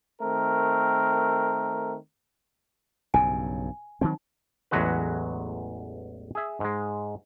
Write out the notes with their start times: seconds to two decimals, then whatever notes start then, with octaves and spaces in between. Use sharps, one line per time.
0.22 D#3 A3 C4 A#4
3.14 B1 G2 C#3 G#5
4.01 D#3 F#3 C4 D#4
4.71 A1 E2 F#3 G#3 F#4 B4
6.35 G#4 E5
6.60 G#2 G#3